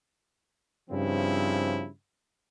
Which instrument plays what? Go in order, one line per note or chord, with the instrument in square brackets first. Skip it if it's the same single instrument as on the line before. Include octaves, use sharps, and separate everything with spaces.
[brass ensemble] G2 C#3 F3 C4 E4